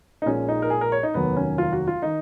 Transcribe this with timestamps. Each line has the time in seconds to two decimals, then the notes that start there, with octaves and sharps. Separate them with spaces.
0.22 D#4
0.26 A#1 A#2 G#3 C#4
0.49 D#4
0.62 A#4
0.70 G#4
0.81 A#4
0.92 C#5
1.03 D#4
1.14 F1 D#2 D#3 F#3 B3
1.37 C#4
1.58 F4
1.73 F#4
1.88 F4
2.02 D#3 D#4